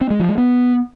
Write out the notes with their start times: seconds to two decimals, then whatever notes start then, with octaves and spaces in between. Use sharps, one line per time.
0.01 C4
0.10 G#3
0.20 F3
0.29 G#3
0.38 B3